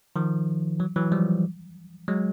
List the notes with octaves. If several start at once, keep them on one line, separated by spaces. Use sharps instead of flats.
D#3 F3
E3 F#3
E3 F#3
F3 G3
F#3 G#3